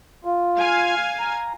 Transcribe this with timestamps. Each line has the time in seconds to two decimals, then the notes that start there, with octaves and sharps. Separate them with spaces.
0.25 F4
0.59 F5 G#5
1.19 A#5